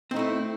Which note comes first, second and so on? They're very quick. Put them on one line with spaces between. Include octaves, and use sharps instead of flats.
C4 D#4 A3 E4